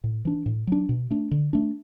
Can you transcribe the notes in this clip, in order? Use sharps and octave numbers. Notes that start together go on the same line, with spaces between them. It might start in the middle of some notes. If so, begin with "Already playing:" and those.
A2
E3 D4
A2
F#3 D4
B2
A3 D4
D3
A3 D4